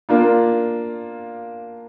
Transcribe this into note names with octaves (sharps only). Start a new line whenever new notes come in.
A#3 D4 F4